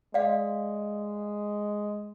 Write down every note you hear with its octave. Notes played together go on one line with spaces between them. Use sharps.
G#3 D5 F5